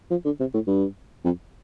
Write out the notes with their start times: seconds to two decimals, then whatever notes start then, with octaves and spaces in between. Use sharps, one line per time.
0.11 F3
0.25 D3
0.40 C3
0.54 A2
0.68 G2
1.25 F2